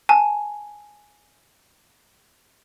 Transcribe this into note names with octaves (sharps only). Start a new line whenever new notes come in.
G#5 A5